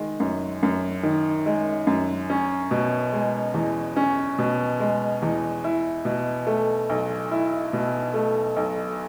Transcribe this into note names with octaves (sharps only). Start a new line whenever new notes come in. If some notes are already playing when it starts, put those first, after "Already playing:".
Already playing: D#3 G#3
F#2
F#2
D#3
G#3
F#2
C#4
B2
G#3
E2
C#4
B2
G#3
E2
E4
B2
A3
B1
E4
B2
A3
B1